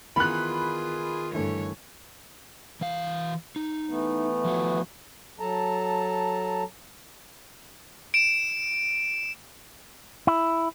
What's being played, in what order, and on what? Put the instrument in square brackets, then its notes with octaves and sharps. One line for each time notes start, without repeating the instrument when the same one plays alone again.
[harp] D#3 B3 A#4 [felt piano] E3 [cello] F4 G#4 [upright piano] B5 F#6
[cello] G2 C#5 [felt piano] D3 E3 A3
[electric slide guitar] E3 F5
D#4
[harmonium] E3 A3 B3
[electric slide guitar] F3 F#4
[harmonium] F#3 A4 A5 A#5
[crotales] D7 E7
[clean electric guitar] E4